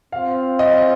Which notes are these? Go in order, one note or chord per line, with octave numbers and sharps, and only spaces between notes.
C4 F4 C5 F5
D#5